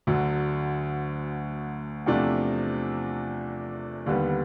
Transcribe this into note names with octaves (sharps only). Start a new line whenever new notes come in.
D2 D3 F#3
E2 C3 F3 A3 D4
D#2 D3 G3 B3